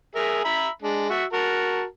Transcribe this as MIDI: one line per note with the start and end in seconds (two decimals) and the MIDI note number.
0.15 0.43 68
0.15 0.43 70
0.15 0.43 76
0.44 0.68 76
0.44 0.68 82
0.44 0.68 83
0.82 1.10 56
0.82 1.10 62
1.10 1.24 66
1.10 1.24 76
1.33 1.84 66
1.33 1.84 70
1.33 1.84 81